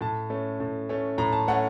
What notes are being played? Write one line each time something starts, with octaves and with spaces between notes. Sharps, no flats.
A2 A5
A3 C#4
A2
A3 C#4
A2 A#5
A5
A3 C#4 F#5